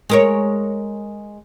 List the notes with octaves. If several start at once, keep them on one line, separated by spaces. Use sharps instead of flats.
G#3 A#4 C#5